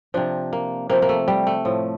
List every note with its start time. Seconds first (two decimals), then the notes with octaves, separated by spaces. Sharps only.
0.14 C3 F3 D4
0.53 A#3
0.90 C3 F3 A#3
1.02 A#3
1.09 A3
1.28 G3
1.47 A3
1.65 A2 F3